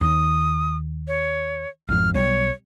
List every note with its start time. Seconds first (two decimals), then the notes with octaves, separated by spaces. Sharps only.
0.01 D#2 D#6
1.08 C#5
1.89 G#1 F2 F6
2.14 B1 G3 C#5